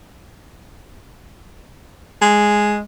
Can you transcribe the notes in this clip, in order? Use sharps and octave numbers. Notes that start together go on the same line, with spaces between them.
G#3